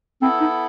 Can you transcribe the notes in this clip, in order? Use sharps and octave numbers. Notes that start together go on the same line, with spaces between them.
B3 C4 E4 A4
D#4